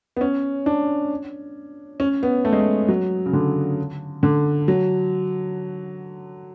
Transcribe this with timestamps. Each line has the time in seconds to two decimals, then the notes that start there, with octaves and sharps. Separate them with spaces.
0.17 B3
0.21 C#4
0.66 D4
2.00 C#4
2.23 B3
2.45 A3
2.52 G#3
2.60 A3
2.88 F#3
3.26 C#3
3.33 D3
4.23 D3
4.68 F#3